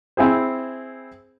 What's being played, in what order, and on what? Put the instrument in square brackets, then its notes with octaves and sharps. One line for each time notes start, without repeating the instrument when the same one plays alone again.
[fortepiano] C4 E4 G#4 C5